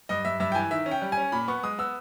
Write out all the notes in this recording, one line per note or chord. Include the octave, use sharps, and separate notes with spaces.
G2 D#5
G2 E5
G2 E5
G5
E3 G#5
D#3 E5
C#4
G5
G3
G#5
C#4
A#2 B5
B3 C#6
G#3 D#6
B3 E6